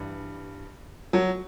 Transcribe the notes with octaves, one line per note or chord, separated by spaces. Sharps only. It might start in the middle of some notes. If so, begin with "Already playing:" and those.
Already playing: G2 E3
F#3